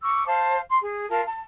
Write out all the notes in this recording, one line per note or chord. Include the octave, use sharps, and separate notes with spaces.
C#6 D6 E6
C5 F5 A5
C6
G#4
F4 A#4 F5 A5
A5